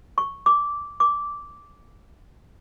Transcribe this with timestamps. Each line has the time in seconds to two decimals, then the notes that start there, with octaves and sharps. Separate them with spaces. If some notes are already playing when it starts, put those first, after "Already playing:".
0.18 C#6
0.46 D6
1.00 D6